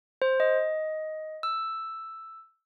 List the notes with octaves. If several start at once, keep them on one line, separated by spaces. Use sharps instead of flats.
C5
D#5
E6